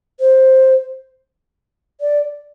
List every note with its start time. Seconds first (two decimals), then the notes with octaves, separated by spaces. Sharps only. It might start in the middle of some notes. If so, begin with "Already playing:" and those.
0.20 C5
2.01 D5